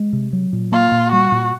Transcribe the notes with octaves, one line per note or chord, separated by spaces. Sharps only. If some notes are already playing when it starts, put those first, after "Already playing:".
Already playing: G#3
C3
F#3
A#2
A#3 F4
A#2
G3 F#4
A#2